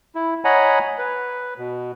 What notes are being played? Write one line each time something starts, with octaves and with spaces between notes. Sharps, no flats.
E4
C#5 D#5 F#5 G#5 A#5 B5
B4
B2